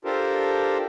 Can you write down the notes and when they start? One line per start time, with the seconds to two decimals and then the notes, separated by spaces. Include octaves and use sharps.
0.05 D4 F4 G4 A4 A#4 C5